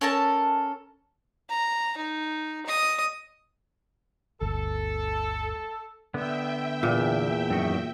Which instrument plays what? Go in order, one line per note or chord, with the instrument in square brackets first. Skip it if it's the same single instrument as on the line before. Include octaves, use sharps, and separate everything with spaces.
[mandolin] C#4 A4 A#4 A5
[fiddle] A#5
D#4
D#5 D#6
[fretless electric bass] G1 D2 [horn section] A4
[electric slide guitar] D3 B3 [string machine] E5 G5
[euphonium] E2 [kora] A#2
[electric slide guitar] F#2 D#3 F#4